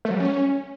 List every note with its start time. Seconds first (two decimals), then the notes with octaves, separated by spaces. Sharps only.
0.05 A3
0.10 F#3
0.15 G3
0.20 C#4